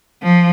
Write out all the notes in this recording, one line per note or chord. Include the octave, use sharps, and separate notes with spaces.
F3